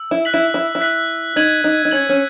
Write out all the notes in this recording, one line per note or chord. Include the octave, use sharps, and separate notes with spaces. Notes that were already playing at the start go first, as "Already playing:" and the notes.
Already playing: E6
E4
F#6 B6 F#7
E4
E4
E4
F#6 B6 F#7
D#4 G#6 D#7 F#7
D#4
D#4
C#4 G#6 D#7 F#7
C#4